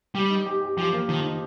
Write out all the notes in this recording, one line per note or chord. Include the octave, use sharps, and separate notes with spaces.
G3 G4
D#4
G4
G4
F3 G4
A#3
D#3 F3
D#4